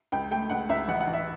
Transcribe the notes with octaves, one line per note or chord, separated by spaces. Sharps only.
C#2 G5
A3 G5
C#2 F#5
C#2 E5
A1 F#5
F#5
A1
E5